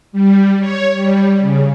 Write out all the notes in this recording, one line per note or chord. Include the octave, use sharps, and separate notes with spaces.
G3
C#5
G3
C#3